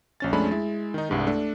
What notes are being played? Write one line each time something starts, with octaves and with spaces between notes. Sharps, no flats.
A#1 C#4 A6
F2 G#3 A3 C#4 D4 B5
G#3 E4
D#3 D#4
C2 G2 G#3
A3 D4 A4